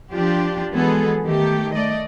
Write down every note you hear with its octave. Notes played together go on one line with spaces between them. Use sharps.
F3 D4 F4 G4
E3 F#3 G#3 B3 G#4 A4
D#3 A3 G4
A3 D5 D#5